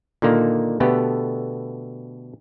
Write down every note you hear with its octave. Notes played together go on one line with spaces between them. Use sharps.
A#2 D3 D#3 A#3
B2 D3 A3 B3 G4